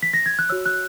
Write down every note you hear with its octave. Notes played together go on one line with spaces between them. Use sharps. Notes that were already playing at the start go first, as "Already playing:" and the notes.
B6
A#6
G#6
F#6
F#4 C#5 E6
F#6